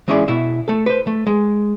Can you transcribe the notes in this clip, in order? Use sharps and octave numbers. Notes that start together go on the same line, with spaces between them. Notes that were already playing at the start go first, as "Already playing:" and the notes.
E3 G#3 C#4 E4 G#4 D5
B2 E4 E5
A3 A4
B4 C5
A3
G#3